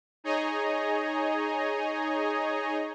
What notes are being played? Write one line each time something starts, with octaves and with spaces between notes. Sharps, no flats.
D#4 G#4 C#5 D#5 G#5 A#5